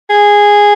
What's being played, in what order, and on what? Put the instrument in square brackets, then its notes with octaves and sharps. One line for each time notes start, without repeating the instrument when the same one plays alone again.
[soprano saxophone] G#4